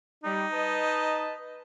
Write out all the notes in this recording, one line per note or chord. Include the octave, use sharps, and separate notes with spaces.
G3 D#4
B4 D#5 A5